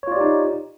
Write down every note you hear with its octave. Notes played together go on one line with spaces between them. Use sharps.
D#4 F4 G4 C#5 D5